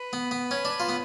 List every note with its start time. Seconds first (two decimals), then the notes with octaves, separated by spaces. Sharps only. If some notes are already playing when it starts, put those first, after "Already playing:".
Already playing: B4
0.13 B3
0.31 B3
0.51 C#4
0.65 D4
0.80 F4
0.89 B3